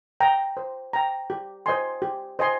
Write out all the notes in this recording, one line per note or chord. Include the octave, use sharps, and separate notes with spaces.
G5 A#5
C5
G5 A#5
G4
C5 D#5 G#5 C6
G4
C5 D#5 G#5 C6